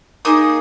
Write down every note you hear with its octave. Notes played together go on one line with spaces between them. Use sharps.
A#3 D#4 G#4 D#6